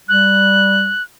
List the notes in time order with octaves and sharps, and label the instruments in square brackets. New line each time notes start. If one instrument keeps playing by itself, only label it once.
[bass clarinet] G3 [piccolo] F#6